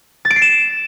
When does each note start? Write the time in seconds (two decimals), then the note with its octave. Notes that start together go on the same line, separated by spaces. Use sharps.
0.25 A6
0.30 D7
0.36 C7
0.42 E7